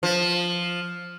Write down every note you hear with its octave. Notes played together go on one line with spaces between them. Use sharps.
F3